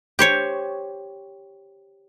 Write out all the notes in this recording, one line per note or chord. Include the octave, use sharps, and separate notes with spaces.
G4 C5 C#5